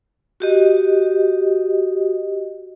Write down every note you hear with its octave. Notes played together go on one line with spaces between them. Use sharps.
F#4 G4 D#5